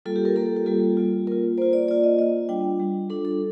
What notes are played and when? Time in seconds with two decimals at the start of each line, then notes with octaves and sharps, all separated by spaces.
0.06 G3 A#3 F4 A4
0.16 G4
0.25 A#4
0.36 G3 A#3 F4 A4
0.46 G4
0.56 G4
0.66 G3 A#3 F4 A4
0.97 G3 A#3 F4
1.27 A#3 A#4
1.32 F4
1.58 A#3 F4 C5
1.73 D5
1.88 A#3 F4 D5
2.03 D#5
2.18 A#3 F4 D#5
2.49 G3 D4 F4 G5
2.80 G3 D4 F4
3.10 G3 D4 F4 A4
3.25 A4